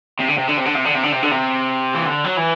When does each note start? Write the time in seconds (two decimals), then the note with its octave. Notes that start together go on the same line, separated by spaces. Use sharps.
0.19 C3
0.28 D3
0.38 C3
0.48 D3
0.57 C3
0.65 D3
0.75 C3
0.85 D3
0.95 C3
1.03 D3
1.12 C3
1.23 D3
1.31 C3
1.95 E3
2.06 D3
2.24 F#3
2.37 E3